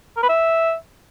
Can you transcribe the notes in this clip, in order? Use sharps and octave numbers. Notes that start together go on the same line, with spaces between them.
A#4
B4
E5